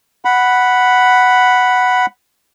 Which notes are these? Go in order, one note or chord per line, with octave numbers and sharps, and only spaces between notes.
F#5 B5